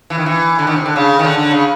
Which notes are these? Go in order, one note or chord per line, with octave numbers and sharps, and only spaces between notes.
E3
D#3
E3
D3
D#3
C3
D3
C#3
D#3
D3
D3
C#3